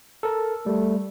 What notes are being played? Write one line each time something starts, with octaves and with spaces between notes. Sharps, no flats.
A4 A#4
G3 A3